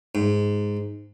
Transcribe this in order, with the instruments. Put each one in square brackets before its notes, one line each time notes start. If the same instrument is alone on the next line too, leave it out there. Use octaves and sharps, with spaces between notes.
[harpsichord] G#2